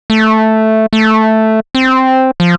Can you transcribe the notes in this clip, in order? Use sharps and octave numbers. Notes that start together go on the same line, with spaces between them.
A3
A3
C4
F3